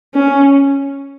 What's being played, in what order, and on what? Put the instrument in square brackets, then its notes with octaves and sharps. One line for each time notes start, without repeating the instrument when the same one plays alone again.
[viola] C#4